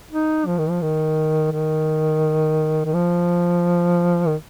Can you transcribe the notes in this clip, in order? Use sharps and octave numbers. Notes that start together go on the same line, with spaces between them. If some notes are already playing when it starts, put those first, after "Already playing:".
D#4
F3
D#3
F3
D#3
D#3
D#3
F3
D#3